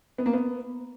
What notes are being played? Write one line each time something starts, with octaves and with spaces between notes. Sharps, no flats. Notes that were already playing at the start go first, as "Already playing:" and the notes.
B3
A#3
B3